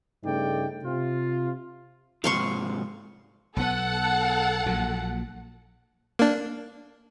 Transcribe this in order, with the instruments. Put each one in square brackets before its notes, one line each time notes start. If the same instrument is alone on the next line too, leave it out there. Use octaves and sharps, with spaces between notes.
[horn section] G2 C#3 A3 D#4 D5 G5
C3 F4
[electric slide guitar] G#2 C3 F3 [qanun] F5 C6 C#6
[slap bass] B1 B3 [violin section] A4 F#5
[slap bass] A#1 A#2 F#3
[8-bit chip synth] A#3 D4